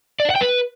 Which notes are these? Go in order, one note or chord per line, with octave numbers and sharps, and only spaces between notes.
D5
D4
F#5
G5
B4